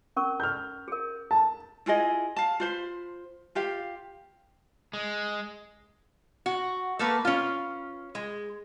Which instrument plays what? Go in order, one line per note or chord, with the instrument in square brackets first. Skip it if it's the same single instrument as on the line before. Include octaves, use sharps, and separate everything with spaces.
[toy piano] C#4 A#4 C#6
[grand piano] F6 G6
[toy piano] G#4 A#4
[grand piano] A5
[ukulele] E4 F4 G#4 D#5
F5 A5
F4 C5 B5
F4 G4 F5
[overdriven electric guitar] G#3
[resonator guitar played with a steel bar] F#4
A3 A#3 B4
C#4 F4
G#3